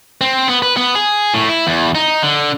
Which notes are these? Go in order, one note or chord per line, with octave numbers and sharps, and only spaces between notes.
C4
B3
B4
B3
G#4
A2
E4
E2
D#4
D3